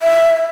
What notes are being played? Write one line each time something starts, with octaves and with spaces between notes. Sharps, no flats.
E5